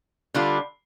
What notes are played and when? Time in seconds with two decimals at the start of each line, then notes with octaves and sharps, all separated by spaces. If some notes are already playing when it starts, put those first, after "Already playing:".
0.34 D3 G3 D4 F4